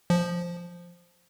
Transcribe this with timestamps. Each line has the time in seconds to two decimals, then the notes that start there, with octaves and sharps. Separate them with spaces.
0.10 F3